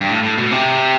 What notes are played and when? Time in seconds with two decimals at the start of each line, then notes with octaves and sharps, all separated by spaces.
0.01 G2
0.09 A2
0.23 A2
0.38 B2
0.51 C3